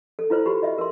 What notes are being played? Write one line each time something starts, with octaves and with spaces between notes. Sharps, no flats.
A4
E4 F4 B4 C5
F#4 G4 B5
D#5 E5
A#4 C6